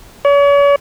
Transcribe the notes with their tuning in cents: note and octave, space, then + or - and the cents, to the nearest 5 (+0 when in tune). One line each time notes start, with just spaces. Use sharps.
C#5 +40